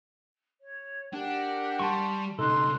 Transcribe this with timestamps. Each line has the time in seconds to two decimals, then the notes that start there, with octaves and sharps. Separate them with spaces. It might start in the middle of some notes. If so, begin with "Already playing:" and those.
0.61 C#5
1.13 D4 G4 A#4 F#5
1.80 G3 A5 C6 C#6
2.39 B1 C#3 D#4 A4 C6 F#6